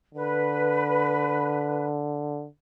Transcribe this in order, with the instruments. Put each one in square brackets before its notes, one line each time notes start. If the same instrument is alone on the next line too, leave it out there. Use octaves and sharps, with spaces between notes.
[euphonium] D3 [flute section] B4